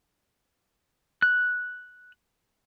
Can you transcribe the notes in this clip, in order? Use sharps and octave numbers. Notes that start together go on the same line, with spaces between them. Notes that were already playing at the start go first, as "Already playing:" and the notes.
F#6